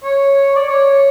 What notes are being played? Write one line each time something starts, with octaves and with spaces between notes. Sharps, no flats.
C#5
D5
C#5